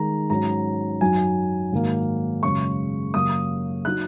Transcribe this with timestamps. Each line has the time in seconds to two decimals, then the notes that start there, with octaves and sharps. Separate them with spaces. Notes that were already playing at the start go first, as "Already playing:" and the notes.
Already playing: D#3 G#3 D#4 A#5
0.30 G#2 F#3 C#4 A#5
1.01 F#2 F#3 D#4 G#5
1.72 G#2 D#3 F#3 A#3
2.43 F#2 C#3 G#3 C#4 C#6
3.14 F#2 C#3 A#3 D#6
3.85 F#3 D#4 F#6